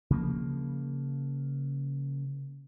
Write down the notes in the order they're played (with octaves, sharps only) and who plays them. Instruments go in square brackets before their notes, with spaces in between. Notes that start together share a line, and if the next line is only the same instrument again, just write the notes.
[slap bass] C#3 F3 A#3